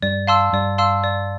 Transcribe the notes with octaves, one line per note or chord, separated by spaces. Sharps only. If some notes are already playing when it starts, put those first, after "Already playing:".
G2 G3 D5
F5 A5 C6 E6
G2 G3 D5
F5 A5 C6 E6
D5